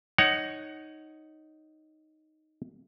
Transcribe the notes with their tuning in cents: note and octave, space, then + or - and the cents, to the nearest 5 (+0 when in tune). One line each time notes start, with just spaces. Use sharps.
D#4 +0 C#5 +0 F#5 +20